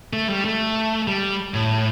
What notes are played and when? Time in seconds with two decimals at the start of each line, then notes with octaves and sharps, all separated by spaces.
0.13 A3
0.29 G3
0.45 A3
1.07 G3
1.54 A2